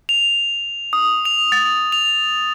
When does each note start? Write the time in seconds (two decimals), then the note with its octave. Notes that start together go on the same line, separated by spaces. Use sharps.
0.09 F7
0.93 D#6
1.25 F7
1.52 A6
1.92 F7